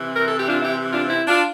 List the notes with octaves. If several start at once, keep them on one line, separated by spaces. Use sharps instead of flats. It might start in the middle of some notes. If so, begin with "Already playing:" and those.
Already playing: C3 E3
A#4
A4
G4
D4 F4
E4 G4
D4 F4
C4 E4
D4 F4